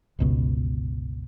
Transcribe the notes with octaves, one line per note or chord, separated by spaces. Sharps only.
G1 C#2 B2